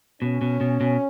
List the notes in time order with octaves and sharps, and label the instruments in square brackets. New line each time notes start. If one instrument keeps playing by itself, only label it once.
[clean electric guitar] B2 [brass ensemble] C#4
[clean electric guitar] B2
B2
B2